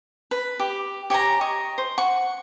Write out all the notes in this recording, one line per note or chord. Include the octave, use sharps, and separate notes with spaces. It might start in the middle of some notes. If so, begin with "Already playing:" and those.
B4
G4
G4 C#5 G#5 A#5
D#5 C#6
C5
F#5 C#6